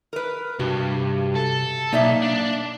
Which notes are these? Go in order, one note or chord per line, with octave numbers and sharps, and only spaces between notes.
A#4 B4
G2 C3 F#4
A4
B1 A#3 D#4 D5 E5
D4